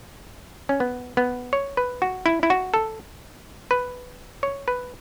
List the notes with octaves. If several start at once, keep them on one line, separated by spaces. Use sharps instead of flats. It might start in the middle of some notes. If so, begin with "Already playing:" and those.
C#4
B3
B3
C#5
B4
F#4
E4
E4
F#4
A4
B4
C#5
B4